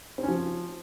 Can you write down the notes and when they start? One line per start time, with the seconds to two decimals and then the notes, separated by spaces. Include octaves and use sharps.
0.18 C4
0.23 C#4
0.28 F3